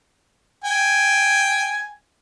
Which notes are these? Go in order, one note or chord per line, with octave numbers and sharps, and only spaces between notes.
G5 G#5